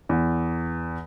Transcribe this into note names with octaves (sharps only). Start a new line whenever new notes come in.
E2